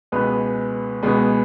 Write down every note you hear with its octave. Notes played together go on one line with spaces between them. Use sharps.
C#2 B2 G#3 B3 B4
C#2 B2 G#3 B3